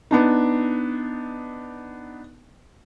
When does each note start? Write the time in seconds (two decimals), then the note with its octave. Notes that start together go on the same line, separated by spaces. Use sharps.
0.11 B3 D4 D#4